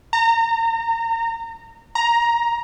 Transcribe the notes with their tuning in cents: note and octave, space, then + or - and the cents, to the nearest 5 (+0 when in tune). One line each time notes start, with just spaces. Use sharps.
A#5 -30
A#5 +10